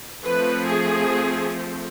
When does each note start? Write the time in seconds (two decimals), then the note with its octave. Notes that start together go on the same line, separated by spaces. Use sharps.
0.24 F3 A3 C4 B4
0.68 G#4